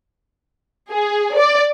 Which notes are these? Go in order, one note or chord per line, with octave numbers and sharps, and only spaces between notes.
G#4
D5